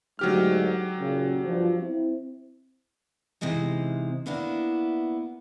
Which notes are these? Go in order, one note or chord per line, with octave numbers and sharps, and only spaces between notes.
D2 G#2 F#3 G4 F6
F#1 A#2 C#3
G2 F3
C4 E4
C3 E3 G#3 D#4 C5
A#3 B3 D4 E4